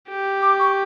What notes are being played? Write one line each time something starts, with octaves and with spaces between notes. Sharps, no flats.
G4
D6
C#6